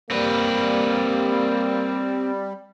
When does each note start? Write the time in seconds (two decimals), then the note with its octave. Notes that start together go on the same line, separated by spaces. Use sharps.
0.11 G3 A#3 C4 B4